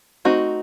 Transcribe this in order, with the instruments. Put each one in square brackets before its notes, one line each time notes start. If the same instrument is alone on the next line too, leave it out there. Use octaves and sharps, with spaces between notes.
[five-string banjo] A3 C4 D#4 F#4